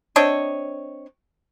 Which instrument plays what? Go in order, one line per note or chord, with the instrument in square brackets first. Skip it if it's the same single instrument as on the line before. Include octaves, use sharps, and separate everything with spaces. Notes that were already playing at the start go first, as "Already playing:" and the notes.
[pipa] C4 D4 C#5 D#5